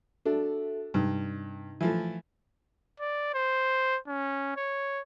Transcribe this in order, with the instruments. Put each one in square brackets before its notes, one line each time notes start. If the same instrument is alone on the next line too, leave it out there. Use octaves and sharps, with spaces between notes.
[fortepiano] D4 [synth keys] F#4 A4 E5
[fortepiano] G2 [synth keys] C3 D#4
[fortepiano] E3 F3 A3
[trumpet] D5
C5
C#4
C#5